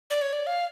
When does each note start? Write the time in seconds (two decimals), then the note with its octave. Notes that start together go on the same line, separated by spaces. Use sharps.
0.10 D5
0.22 C#5
0.33 D5
0.47 F5